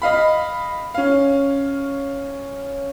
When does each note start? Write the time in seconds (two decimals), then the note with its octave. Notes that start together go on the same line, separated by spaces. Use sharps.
0.02 D#5 F5 B5
0.94 C#4 F5